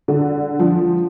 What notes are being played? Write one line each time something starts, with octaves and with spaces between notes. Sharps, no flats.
D3
F3